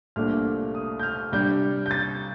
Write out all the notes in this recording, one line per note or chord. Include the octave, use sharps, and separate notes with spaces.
C2 A#2 A3 D4 F6
D#6
G6
F6
C3 G3 D4 G6
G6
A6